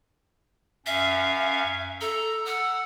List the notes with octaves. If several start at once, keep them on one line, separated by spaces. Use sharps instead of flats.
F#2 C#4 E5 F5
A4 A#5
F#5 E6